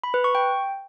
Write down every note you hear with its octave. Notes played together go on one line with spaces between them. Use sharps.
B5
B4
C#6
G5